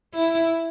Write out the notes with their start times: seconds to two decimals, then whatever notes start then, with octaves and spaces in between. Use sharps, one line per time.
0.14 E4